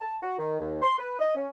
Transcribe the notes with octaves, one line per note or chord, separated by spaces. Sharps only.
A5
F#4
D#3
D#2
C6
B4
D#5
C#4